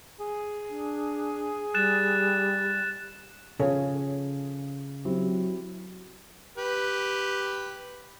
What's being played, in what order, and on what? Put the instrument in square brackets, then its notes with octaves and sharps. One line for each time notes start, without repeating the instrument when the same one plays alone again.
[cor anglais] G#4
[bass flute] D4
[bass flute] G3 [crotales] F#6 A6 E7
[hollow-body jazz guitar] C#3 [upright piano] F3 G#4 A4 [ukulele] C#5
[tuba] F#3 [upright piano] C4 E4 G4
[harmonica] G4 B4